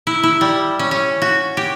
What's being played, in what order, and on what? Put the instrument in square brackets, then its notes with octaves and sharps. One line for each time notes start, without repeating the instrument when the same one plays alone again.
[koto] E4
E4
G3
C#4
C#4
F#4
G4